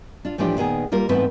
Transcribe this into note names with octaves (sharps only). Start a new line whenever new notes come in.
D4 F4
A2 E3 F3 A3 D4 G4
A#2 D#3 B3 G#4
G3 A#3 F4 A#4
G#2 E3 A3 B3 C4 B4